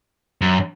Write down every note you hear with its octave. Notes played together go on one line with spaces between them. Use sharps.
F#2